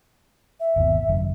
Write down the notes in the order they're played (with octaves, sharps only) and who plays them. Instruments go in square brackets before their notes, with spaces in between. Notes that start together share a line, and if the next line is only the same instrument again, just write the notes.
[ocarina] E5
[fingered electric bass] G1 D#2 B2
G#1 F#2 C#3